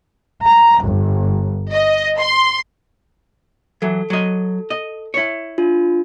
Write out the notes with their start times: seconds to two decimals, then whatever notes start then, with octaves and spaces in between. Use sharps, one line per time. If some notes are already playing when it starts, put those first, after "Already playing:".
0.45 A#5
0.80 G1
1.73 D#5
2.20 C6
3.82 E3 F#3 A4
4.10 F#3 D#5
4.70 D#5
5.14 E4 C#5
5.58 D4 F4